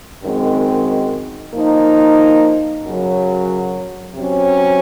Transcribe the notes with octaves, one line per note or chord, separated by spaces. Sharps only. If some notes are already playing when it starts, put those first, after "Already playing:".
F#2 D#3 G#3 C4
F3 A#3 D#4
F#2 C#3 F#3
C3 F#3 C#4